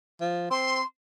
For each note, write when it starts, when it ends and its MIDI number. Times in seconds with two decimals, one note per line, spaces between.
0.21 0.49 53
0.51 0.80 60
0.51 0.82 84